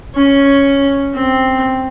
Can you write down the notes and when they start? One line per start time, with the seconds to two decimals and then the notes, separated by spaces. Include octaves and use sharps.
0.15 C#4
1.14 C4